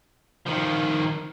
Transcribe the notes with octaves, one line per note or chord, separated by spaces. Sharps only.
D#3 F3